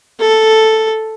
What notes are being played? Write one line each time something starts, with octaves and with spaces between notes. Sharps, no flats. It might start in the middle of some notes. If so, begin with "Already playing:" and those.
A4